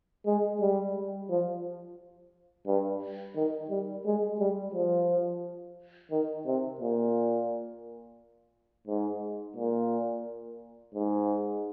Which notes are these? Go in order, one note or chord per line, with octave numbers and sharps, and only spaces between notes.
G#3
G3
F3
G2
D#3
G3
G#3
G3
F3
D#3
C3
A#2
G#2
A#2
G#2